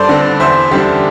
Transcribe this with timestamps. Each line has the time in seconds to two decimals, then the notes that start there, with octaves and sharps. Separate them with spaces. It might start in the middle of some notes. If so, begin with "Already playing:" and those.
Already playing: G2 A4 C5 D5
0.09 D3 C4
0.40 E2 C5 E5
0.71 D3 G3 D4 G4 C5